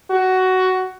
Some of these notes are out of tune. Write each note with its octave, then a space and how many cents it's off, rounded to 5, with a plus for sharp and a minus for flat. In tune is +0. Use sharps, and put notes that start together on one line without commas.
F#4 +10